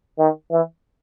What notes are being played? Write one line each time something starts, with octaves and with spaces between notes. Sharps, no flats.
D#3
E3